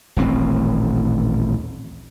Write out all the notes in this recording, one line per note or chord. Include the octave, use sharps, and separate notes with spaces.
D#1 A1 C4